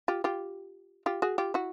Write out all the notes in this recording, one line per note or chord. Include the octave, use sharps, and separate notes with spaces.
F4 G4
F4 G4
F4 G4
F#4 G#4
F4 G4
E4 F#4